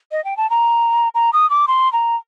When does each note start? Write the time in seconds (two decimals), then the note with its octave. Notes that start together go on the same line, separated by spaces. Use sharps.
0.12 D#5
0.25 G5
0.37 A5
0.50 A#5
1.15 A#5
1.33 D#6
1.50 D6
1.68 C6
1.93 A#5